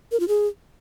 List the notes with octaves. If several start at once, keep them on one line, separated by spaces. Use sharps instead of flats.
A#4
F4
G#4